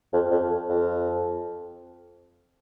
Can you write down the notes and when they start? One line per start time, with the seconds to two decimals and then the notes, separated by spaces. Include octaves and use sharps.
0.13 F2
0.31 F2
0.69 F2